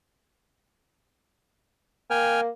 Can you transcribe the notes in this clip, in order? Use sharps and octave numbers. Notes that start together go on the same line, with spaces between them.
A#3 G5 G#5 F6